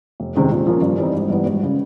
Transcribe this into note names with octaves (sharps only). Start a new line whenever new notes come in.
F1
E2 C3 D#3 G#3
A#2
F3 A#3 C#4
G2
E3 G3 C4 D#4
G#1
G2 E3 G3 B3
G#1
C#3